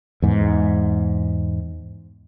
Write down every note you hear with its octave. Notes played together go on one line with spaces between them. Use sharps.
E2 G#2